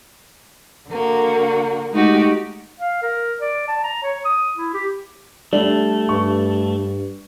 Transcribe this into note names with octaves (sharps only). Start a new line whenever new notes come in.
D3 A#3 F#4
G#3 A3 D#4 F#4 G4
F5
A#4
D5
A5
A#5
C#5
D#6
E4
G4
G3 A3 D4 F#7
G2 C#6